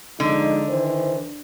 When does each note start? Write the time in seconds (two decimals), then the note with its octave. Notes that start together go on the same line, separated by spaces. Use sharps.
0.20 D3 F3 G#3 D#4
0.68 D#3 E3 C5